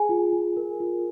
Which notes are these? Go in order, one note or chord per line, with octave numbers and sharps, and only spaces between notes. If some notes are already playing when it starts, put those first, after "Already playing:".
Already playing: G#4 G#5
F4
F4
A#4
F4